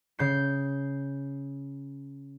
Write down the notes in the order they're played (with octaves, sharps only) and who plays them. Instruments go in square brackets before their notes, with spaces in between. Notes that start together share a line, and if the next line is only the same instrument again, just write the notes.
[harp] C#3 G6 C7